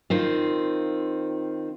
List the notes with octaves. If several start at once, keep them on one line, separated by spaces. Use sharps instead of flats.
D#3 C4 F4